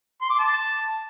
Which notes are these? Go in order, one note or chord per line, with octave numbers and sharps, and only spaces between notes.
C6
D6
A5